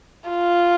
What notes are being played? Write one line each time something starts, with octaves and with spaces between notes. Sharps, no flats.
F4